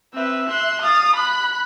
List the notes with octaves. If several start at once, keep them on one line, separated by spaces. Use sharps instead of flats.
C4 B4 E5
C6 F#6
F5 D#6 A6
B5 F#6